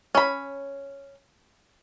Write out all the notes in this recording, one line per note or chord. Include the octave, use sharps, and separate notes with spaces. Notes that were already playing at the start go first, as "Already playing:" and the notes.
C#4 B5